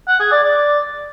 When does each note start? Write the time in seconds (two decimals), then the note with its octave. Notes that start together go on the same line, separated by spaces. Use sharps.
0.08 F#5
0.20 G#4
0.32 D5
0.44 D5